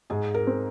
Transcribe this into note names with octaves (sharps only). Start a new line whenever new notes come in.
G#2 G#4
A#4
C4